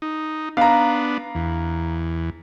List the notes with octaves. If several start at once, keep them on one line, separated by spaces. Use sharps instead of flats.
D#4
B3 D4 F5 A#5
E2